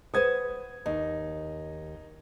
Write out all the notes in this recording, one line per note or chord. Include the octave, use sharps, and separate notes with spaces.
B4 C5 F#5 D#6 G#6
D#2 D#4